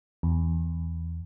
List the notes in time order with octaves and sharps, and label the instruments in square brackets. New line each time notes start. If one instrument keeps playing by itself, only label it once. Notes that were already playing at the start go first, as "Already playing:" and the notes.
[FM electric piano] E2